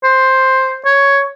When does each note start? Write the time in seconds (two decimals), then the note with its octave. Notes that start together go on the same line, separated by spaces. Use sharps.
0.04 C5
0.85 C#5